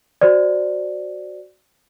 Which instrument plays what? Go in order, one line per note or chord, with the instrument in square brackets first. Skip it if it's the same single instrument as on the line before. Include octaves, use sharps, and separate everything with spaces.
[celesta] F#4 C5 D5